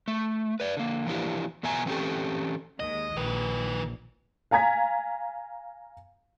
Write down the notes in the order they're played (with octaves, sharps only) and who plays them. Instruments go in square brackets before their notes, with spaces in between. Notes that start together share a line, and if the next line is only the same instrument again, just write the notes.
[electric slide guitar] A3
B4 D5
D3 A#3
E3 F3 A#3 D4 E4 G4
E2 B2 B3 E5 G#5 A#5
E3 C4 C#4 G4 A4
[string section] D#2 D#3 G#3 [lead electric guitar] D#5
[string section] A#1 [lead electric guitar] D#3 B4
[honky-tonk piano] F5 G#5 A#5 G#6 B6